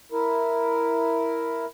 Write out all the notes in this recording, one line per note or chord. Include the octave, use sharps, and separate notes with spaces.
E4 A#4